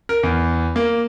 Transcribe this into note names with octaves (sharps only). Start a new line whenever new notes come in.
A#4
E2
A#3